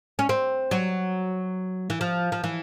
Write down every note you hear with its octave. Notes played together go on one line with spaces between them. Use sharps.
C#4
C4
F#3
E3
F3
F3
E3